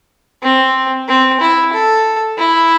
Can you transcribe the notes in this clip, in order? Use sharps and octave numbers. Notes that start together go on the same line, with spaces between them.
C4
C4
E4
A4
E4